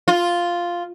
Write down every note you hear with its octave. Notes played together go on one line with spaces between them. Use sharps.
F4